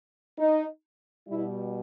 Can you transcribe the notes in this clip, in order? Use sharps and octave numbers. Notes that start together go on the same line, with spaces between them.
D#4
B2 G3 E4